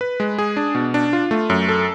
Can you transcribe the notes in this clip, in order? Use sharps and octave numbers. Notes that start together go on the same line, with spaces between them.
B4
G#3
G#4
D4
B2
D4
F4
A3
F#2
A4